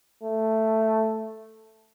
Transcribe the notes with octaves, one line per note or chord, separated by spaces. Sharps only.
A3